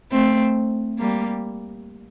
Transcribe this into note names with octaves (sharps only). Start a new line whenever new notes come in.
A3 C4
G3 A#3